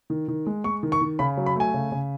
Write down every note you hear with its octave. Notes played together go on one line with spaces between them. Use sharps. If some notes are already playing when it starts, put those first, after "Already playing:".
D#3
D#3
G#3
G#3 C#6
D#3
C#6
D#3
C#3 B5
F#3
B5
A3 G#5
C#3
C#3